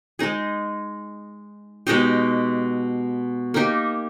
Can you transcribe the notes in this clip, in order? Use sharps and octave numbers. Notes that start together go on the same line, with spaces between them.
G#3 D#4 G#4
B2 G#3 D#4 G4
A#3 D#4 G4